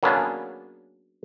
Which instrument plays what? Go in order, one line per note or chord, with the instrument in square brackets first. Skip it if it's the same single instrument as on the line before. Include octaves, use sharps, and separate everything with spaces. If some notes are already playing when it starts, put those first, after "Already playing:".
[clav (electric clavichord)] F#3 A#3 B3 C#4 D4 G#4